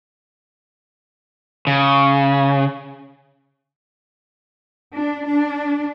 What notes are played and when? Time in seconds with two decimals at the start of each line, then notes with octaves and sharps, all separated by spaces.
1.67 C#3
4.95 D4
5.26 D4